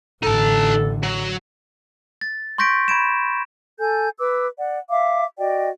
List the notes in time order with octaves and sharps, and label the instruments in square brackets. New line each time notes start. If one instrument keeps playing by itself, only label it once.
[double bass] A1 D3 [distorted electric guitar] D#4 A5 [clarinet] A4
[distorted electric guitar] F#3
[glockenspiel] A6
C6 C#6 G6 A#6 B6 D7
B5 G#6 D7 E7
[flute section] A4 G#5 G6
B4 D6 E6
D5 F#5
E5 F5 D6
F#4 D5 D#5 G5